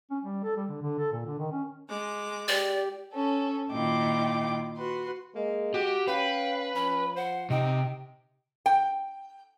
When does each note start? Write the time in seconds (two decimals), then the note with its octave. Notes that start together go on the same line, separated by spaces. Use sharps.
0.10 C#4
0.23 G3
0.44 A4
0.56 G3
0.69 D3
0.82 D3
0.99 A4
1.12 A#2
1.25 D3
1.39 D#3
1.52 C#4
1.89 G#3 D6
2.48 G4 D5
3.14 C#4 A4
3.71 A#2 D#3 E4 F4 G5 D6
4.78 F#4 B4 C6
5.35 G#3 A#3
5.74 F#4 G4
6.07 C#4 B4 F5 G5
6.75 F3 C#4 B5
7.16 C5 F#5
7.50 C3 D#4 G5
8.66 G5